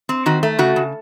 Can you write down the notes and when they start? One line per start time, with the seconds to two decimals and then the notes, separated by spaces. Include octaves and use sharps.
0.09 C4
0.26 D#3 F#4
0.43 A3
0.59 C#3 F#4
0.76 C#3